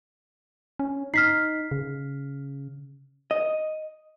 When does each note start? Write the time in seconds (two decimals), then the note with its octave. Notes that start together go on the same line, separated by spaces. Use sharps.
0.79 C#4
1.14 D#4 F6 B6 C7
1.71 C#3
3.31 D#5